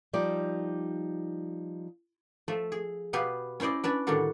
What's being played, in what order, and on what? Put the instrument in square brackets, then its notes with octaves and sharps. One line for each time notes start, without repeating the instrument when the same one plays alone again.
[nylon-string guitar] F3 G3 D#4 D5
[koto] F3 A3 E5
G#4
B2 B3 G4 B4 F5 G#5
C#4 E4 C5 D5 D#5
C#4 D4 B4 D5
A2 D3 D#3 G3 D4 F#4